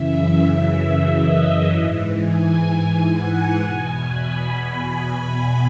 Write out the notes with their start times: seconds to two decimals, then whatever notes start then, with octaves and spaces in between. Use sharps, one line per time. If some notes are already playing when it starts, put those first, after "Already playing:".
Already playing: F#2 C#3 E3 E5
1.21 D#5
1.69 G#2 E3
2.17 G#5
2.65 G#5
3.13 F#5
3.60 E2 B2 G#5
4.07 B5